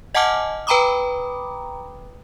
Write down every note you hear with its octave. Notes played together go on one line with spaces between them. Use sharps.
D#5 F#5 G#5 A5 D6 F6
B4 G5 A#5 B5 D6 D#6